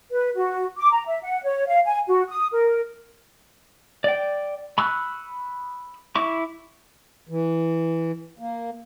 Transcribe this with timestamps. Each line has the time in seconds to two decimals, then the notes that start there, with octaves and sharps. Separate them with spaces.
0.11 B4
0.36 F#4
0.77 D6
0.91 A#5
1.06 E5
1.22 F#5
1.44 C#5
1.67 F5
1.85 G#5
2.07 F#4
2.29 D#6
2.52 A#4
4.04 D5 G5
4.78 B5 C#6 D#6 E6 F#6
6.15 E4 C#6 D6
7.29 E3
8.39 A#3